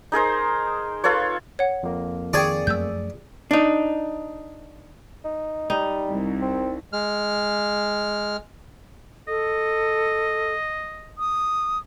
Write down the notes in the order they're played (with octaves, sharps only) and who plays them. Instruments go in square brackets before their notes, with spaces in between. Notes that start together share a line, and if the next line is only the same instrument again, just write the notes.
[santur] D#4 G#4 A#4 C5
F4 A4 B4 C#5
[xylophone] C#5 F#5
[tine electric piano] F2 A#3
[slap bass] D#3 [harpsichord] G#4 D5 C#6 [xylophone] G5 G#6 D7
[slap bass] F#2 F3 A3 [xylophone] E6 G6
[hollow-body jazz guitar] D4 D#4
[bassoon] D#4
[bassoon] G3 [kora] D#4
[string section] C2
[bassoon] C4
[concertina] G#3 F6
[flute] A4 [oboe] D#5
[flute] D#6